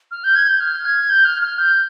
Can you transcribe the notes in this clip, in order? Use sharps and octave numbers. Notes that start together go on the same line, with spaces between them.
F6
G6
G#6
G6
F6
G#6
G6
F6
F6
G6